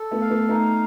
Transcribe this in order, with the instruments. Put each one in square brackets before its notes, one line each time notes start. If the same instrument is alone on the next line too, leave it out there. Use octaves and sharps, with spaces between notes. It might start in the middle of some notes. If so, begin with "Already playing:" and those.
Already playing: [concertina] A4
[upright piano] A3 B3
[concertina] F5
[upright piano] A3 B3
[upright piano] A3 B3 [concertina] D#4